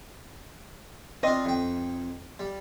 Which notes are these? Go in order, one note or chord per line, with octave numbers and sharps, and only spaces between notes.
C4 D4 F4 D#5
F2 G5
G3